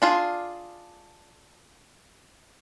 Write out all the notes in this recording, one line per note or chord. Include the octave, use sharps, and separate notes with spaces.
D4 F4 G#4